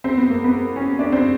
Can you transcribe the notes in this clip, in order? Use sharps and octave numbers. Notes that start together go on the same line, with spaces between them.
C4
B3
A#3
B3
C#4
D4
C4